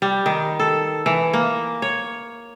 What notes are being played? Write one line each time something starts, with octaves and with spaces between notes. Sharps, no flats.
G3
D#3
A4
E3
A#3
C#5